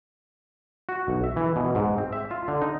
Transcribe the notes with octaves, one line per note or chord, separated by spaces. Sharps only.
F#4
B1
E5
E3
B2
G#2
C4
E5
F4
D3
D#4